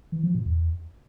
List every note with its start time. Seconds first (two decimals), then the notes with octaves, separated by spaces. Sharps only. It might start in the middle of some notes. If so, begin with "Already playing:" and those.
0.12 E3
0.23 F3
0.35 A#2
0.46 E2